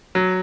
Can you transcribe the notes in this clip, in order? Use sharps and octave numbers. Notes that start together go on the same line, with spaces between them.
F#3